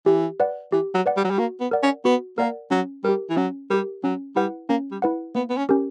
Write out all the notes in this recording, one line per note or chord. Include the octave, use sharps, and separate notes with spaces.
E3 G4
B4 D5 F#5
E3 G4
F#3
B4 D5 F#5
G3
F#3
G3
A#3 F#4
B3
A#4 D5 F#5
C#4
B3 F#4
A#3 A#4 D5 F#5
F#3 C#4
G3 G4 A#4
E3
F#3 C#4
G3 G4 A#4
F#3 C#4
G3 E4 B4 F#5
A#3 C#4
G3
E4 B4 F#5
A#3 B3
B3
C#4
C#4 G4 A#4